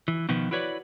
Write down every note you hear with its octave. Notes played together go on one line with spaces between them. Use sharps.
E3
B2 D#3 F3 B3
E4 F#4 B4 C#5 D5